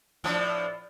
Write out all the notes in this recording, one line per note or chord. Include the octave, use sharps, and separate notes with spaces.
A2 F3 D4